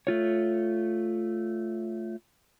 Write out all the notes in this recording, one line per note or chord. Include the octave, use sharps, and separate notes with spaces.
A3 F4 C#5